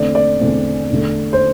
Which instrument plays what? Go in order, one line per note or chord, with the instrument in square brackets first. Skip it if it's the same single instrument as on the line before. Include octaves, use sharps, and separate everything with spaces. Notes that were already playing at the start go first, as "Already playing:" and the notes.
Already playing: [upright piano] E2 D3 A3 C4 D5
D5
E2 D3 A3 C4
E2 D3 A3
C5